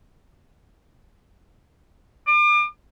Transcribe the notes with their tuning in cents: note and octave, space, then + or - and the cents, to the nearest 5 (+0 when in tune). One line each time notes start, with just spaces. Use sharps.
D6 +40